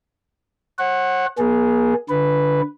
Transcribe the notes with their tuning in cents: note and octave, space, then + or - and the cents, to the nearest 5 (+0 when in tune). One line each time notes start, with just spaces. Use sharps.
C#5 -45 F#5 +0
A#3 +40 G#4 +5
D3 +0 B4 +0